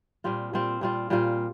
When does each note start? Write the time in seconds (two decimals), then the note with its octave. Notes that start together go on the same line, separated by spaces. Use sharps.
0.24 A#2 G3 C4 F4
0.53 A#2 G3 C4 F4
0.81 A#2 G3 C4 F4
1.10 A#2 G3 C4 F4